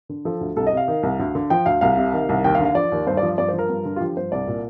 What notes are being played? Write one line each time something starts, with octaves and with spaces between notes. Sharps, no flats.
D3
F3 A4
D2
C2 A4
D#5
C3 F5
D#3
C2
D2
D3
F3 G5
D2 F5
C2 F5
C3
D#3
C2
D#2 G5
F5
D3
F5
F3 D5
D#2
G2 C5
D5
F3
G2 D5
C5
F3
A#4
G2
D3
F4
F3 G4
G2 C5
C2 D5
A#2